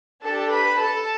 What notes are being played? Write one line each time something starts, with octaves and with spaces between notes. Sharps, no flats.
D4 G4 A4 A5
B4 B5
A4 A5